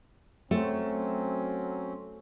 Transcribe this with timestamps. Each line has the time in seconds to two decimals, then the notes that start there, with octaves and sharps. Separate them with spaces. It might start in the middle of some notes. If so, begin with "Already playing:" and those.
0.51 F#3 A3 C4 C#4